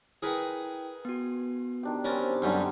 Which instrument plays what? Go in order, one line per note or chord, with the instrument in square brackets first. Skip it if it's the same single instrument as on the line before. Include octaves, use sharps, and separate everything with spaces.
[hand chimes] E4 G5 [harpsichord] G#4 A#4 B4
[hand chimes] B3 F#4
[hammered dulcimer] D#3 D4 G4
[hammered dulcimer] G3 C4 [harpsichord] C#4 A#4 A5
[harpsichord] F#2 G3 C#4 [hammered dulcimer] D3 D#3 D#5